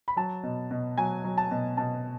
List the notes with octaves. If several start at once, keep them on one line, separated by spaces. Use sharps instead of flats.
B5
F#3 A5
B2
B2
F#3 G#5
F#3
A5
B2
B2 A5